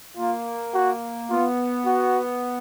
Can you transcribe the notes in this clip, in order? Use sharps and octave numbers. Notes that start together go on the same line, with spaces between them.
A#3 F4
F#4
B3 F4
F#4